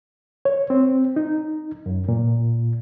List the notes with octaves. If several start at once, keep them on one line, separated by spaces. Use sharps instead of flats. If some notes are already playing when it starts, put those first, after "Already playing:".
C#5
C4
D#4
F#2
A#2